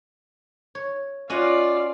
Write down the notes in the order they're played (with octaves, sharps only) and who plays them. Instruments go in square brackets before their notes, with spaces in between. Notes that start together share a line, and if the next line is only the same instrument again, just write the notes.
[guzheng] C#5
[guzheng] C#4 D#5 F#5 [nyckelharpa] F4 D5